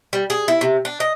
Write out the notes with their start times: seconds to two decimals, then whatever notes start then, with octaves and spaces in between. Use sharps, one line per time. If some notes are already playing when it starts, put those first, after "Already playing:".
0.13 G3
0.30 G#4
0.48 E4
0.61 C3
0.85 D4
1.00 D#5